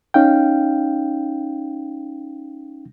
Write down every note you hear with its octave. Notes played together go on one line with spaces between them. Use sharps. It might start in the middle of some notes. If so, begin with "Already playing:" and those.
C#4 D#4 F5 G5